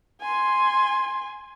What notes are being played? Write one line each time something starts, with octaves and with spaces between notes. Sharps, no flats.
G#5 C6